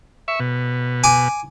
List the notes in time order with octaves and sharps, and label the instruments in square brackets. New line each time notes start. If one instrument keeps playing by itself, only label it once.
[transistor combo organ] E5 C#6
B2
[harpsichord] G#5 D6